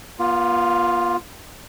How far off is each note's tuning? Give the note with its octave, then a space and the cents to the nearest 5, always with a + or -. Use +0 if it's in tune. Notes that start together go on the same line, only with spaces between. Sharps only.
B3 -45 F4 +0